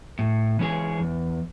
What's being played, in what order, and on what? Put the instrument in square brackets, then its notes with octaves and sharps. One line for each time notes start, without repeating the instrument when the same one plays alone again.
[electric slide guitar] A2
E3 G#3 C#4 G#4
E2